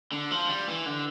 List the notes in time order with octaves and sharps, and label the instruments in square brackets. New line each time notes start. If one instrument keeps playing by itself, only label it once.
[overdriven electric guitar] D3
F3
G3
E3
D3